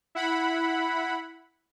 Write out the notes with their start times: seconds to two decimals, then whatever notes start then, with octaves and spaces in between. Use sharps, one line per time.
0.15 E4 F#5 B5